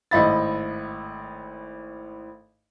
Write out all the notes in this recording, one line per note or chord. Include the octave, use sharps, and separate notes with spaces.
G#1 A2 D#5 E5 B5 A6